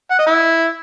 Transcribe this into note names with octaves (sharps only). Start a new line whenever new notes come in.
F#5
D#5
E4